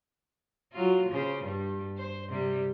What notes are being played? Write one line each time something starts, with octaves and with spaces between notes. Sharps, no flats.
F#3 F4
C#3 C5
G2 G3
C5
C3 G3